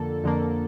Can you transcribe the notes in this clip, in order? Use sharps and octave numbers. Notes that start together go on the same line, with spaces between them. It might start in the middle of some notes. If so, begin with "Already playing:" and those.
Already playing: F2 D3 A#3 A4
F2 D3 F3 A#3